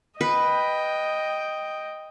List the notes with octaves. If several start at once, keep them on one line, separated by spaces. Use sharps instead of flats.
B4 D#5 G5